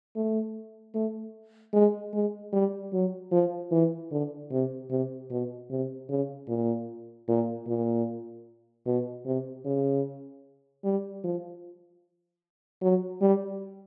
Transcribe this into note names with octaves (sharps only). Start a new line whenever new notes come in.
A3
A3
G#3
G#3
G3
F#3
F3
E3
D3
C3
C3
B2
C3
C#3
A#2
A#2
A#2
B2
C3
C#3
G3
F3
F#3
G3